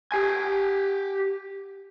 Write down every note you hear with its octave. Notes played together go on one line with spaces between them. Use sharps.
G4 G#5